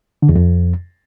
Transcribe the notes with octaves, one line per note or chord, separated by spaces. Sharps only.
D3
E2
F2